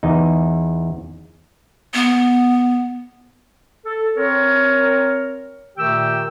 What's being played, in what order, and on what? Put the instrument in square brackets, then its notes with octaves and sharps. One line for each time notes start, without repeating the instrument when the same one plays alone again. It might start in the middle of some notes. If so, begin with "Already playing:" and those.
[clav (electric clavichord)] E2 D#4
[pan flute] B3
[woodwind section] A4
C4 A#4 C#5
A#2 D#3 A3 G4 G5 E6